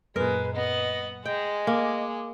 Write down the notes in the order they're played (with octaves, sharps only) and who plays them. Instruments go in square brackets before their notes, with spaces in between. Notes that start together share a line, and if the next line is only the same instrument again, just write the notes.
[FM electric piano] F#2 A#2 [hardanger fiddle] G#3 [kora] A#4 [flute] B4
[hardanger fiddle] B3 [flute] D#5
[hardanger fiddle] G#3 [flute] D#5 [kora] G5
[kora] A#3 [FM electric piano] G#5 D6